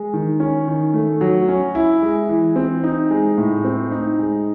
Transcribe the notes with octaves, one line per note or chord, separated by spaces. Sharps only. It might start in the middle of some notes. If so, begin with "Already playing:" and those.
Already playing: G#3
D#3
C#4
D#3
A3
F#3
C#4
E4
G#3
E3
C4
D#4
G#3
A2
C4
D#4
G#3